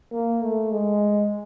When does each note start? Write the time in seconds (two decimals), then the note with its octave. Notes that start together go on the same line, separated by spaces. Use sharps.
0.12 A#3
0.42 A3
0.71 G#3